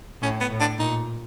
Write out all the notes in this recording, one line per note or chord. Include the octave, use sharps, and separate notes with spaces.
A2 C#4
B3
A2
D4
A#2 D#4